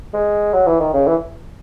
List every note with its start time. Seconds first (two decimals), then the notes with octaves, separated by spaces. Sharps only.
0.14 G#3
0.53 F#3
0.67 E3
0.80 D#3
0.93 C#3
1.07 E3